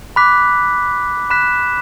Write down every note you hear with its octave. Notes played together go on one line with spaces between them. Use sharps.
B5 D6 F#6 B6
B5 F#6 B6 E7